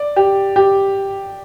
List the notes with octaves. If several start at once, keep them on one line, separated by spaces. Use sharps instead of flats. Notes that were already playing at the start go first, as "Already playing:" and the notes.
Already playing: D5
G4
G4